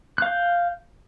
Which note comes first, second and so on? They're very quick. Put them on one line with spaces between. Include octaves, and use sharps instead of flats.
F#6 F5 G6